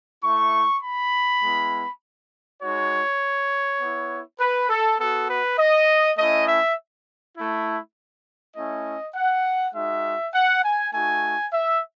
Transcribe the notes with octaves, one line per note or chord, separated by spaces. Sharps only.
A3 E4 C#6
B5
G#3 B3 E4
G#3 D#4 F#4 C#5
B3 E4
B4
A4
B3 F#4 A4
B4
D#5
A3 C#4 E4 D#5
E5
A3 E4
A3 C#4 E4 D#5
F#5
G#3 D#4 F#4 E5
F#5
G#5
A3 D#4 F#4 G#5
E5